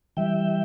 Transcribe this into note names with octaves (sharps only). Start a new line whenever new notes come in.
E3 G3 E5 G5